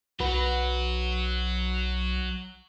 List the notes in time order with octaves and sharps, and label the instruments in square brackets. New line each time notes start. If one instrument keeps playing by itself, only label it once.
[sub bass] B1 [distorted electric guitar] F#3 [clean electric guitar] F#4 B4